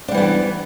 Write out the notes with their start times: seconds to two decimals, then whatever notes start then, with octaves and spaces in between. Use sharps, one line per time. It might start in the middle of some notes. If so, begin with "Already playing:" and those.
0.08 D4
0.11 G3
0.14 E3
0.18 B3